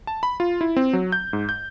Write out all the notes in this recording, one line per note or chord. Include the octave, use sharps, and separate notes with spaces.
A5
B5
F4
E4
C4
F#3
G6
G#2
G6